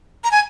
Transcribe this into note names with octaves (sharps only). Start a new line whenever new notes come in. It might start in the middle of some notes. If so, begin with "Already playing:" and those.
A#5
G#5